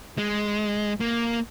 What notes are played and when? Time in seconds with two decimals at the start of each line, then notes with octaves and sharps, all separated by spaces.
0.18 G#3
1.00 A#3